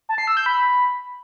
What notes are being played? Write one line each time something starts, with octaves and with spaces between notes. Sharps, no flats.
A5
C7
E6
G6
B5